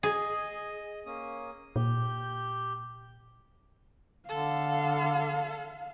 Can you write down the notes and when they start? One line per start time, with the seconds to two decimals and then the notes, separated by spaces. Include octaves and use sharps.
0.03 G#4 D#5
1.06 A#3 C#4 D#6
1.76 A#2 G4 G6
4.29 D3 A4 F5